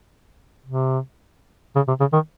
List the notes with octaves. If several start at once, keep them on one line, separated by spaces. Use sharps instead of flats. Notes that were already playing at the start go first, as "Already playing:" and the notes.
C3
C#3
C3
C#3
D#3